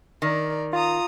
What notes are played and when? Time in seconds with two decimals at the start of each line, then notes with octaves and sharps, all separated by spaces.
0.22 D#3 A#4 D5
0.73 F4 A#5 D#6